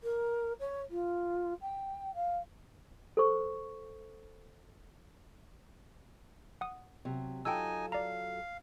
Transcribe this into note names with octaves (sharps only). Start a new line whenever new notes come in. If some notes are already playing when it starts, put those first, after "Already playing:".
A#4
C#5
F4
G5
F5
A4 C5 C#6
F#5 D#6
C3 F#3
F#3 D#4 F4 A4 G5 G#5 E6
D5 F5 A#5